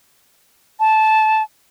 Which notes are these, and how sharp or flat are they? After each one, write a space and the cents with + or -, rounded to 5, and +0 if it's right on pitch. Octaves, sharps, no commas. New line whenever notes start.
A5 -15